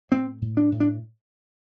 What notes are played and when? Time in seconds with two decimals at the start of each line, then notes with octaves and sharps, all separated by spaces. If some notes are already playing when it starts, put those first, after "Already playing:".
0.11 A2 C4
0.42 A2
0.57 D4
0.72 A2
0.80 D4